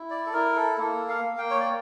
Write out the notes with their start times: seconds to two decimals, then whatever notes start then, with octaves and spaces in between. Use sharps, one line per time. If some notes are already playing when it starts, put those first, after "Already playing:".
Already playing: E4
0.10 D5
0.26 A4
0.33 E4 A#4
0.56 A4
0.78 A#3 A4
1.09 F5
1.24 A#3
1.38 G5
1.51 C#5
1.60 D5